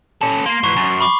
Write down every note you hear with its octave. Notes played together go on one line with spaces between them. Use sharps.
C#4 A4
A#3 C6 C7
G#2 E3 C#6
F#2
B5 C#6 D6